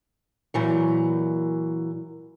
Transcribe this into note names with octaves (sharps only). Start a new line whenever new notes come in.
A#2 E3 F#3